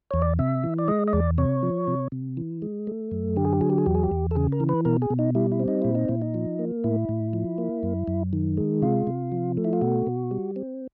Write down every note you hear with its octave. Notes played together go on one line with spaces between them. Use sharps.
E2 C#5
D5
C3 E5
E3
D5
G#3 D#5
D#5
E2 D5
C3 C#5
F3
C3
C3
E3
G#3
A3
F#2
D3 G4
G#4
G4
F#3 G#4
G4
G#4
E2 G4
G#4
G4
E2
A4
C#3 G#4
A#4
E3
B4
B2 A#4
G#4
B2
D#4
G3 E4
E4
C4
D#4
A#2 E4
D#4
A#2 E4
D#4
F3
A#3
A2 E4
A2
F3
A#3
F#2
F#2
D#3
G#3
C3 F4
C3
F3
A3
E4
F4
B2 F#4
B2
G3
C4